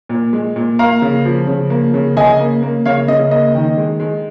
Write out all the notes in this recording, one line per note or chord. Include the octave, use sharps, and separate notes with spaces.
A#2
G#3
A#2
A#3 F5 A#5
C#3
F3
C#3
A#3
C#3
C#3 D#5 G#5
A#3
A#3
C#3 C#5 F5
C#3 D#5
A#3 D#5
D#3
G#3
G#3